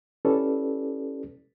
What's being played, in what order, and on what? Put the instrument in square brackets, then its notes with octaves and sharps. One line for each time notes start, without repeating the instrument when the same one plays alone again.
[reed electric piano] C#4 E4 G4 A4 B4 D5